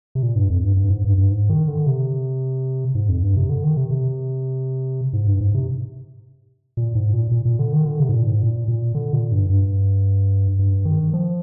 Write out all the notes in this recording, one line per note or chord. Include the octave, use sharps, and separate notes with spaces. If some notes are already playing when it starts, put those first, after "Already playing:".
C3
A#2
G2
F2
G2
G2
G#2
G2
G2
G#2
D#3
D3
C3
G#2
F2
G2
C3
D3
D#3
C3
C3
G#2
G2
G#2
C3
A#2
G#2
A#2
A#2
A#2
D3
D#3
D3
C3
G#2
A#2
G#2
A#2
A#2
D3
A#2
G2
G2
G2
D#3
F3